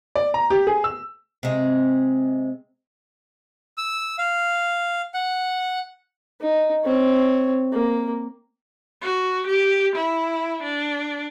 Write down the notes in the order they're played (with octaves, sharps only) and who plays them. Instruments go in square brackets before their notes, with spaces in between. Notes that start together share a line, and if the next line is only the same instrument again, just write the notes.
[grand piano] D5
A#5
G4
G#4
E6
[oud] C3 G#3
[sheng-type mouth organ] E6
F5
F#5
[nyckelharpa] D#4
C4 C#5
A#3
[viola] F#4
G4
E4
D4